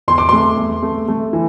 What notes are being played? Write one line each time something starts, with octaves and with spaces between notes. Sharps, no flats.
E2 C6
D6
A3 C6
E2
A3
A3
E3